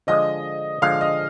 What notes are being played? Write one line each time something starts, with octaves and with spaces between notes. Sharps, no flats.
D3 F3 G#3 D#5 D#6
D3 F3 G#3 F5 F6
D#5 D#6